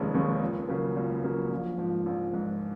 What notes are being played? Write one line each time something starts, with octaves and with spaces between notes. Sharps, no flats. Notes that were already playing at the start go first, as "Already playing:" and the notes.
Already playing: F1 D#2 D#3 G#3 C#4
D#2 D#3 G#3 C#4
C#2
C#3 F#3 A#3
C#2
C#3 F#3 A#3
A#1
G#2 F3
A#1
G#2 F3